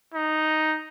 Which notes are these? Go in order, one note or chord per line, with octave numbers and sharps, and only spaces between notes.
D#4